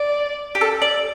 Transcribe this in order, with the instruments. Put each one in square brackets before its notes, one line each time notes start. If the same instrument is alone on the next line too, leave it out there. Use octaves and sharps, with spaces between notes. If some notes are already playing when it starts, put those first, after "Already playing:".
Already playing: [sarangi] D5
[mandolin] G4
A4
D5